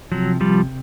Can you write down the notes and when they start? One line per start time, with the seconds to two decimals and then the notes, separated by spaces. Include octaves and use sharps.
0.12 C3 F3 F#3
0.41 F3 G3